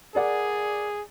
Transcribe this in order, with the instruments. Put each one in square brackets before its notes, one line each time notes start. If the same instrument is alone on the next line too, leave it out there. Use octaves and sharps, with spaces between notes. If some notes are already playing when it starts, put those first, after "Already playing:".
[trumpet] G#4 [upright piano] A#4 D5 F#5